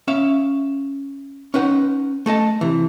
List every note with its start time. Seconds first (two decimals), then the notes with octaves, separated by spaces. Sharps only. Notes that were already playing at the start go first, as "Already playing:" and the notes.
0.08 C#4 E5 F5
1.54 C#4 D#4 B4 F#5
2.26 A3 A4 D#5 A5
2.61 C3 E3